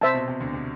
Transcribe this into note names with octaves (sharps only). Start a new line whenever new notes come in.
C3 C5 E5 A5
B2
C3
D2 D3
C3